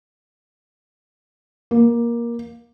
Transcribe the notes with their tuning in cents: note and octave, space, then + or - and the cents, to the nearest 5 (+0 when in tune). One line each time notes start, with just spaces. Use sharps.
A#3 +15